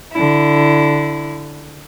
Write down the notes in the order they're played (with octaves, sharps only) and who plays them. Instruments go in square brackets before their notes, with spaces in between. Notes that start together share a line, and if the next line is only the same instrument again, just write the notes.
[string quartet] D3 E4